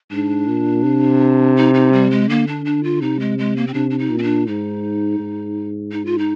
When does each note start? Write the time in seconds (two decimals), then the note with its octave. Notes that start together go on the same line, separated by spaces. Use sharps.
0.11 G#2 D4
0.48 A#2
0.83 C3
1.57 D#4
1.74 D#4
1.93 G3
2.11 G#3
2.29 D3 A#3
2.47 D4
2.65 D4
2.84 F4
3.02 C3 D#4
3.20 G#3
3.39 G#3
3.56 A#3
3.67 C4
3.74 C3 D4
3.90 D4
3.99 D#4
4.10 A#2
4.18 C4
4.23 D4
4.47 G#2 D#4
5.19 G#2
5.92 D#4
6.06 F4
6.19 D#4